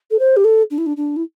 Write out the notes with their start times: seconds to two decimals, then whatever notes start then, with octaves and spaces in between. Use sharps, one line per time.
0.10 A4
0.19 C5
0.36 G4
0.44 A4
0.70 D4
0.78 E4
0.86 D4
0.97 D4
1.16 E4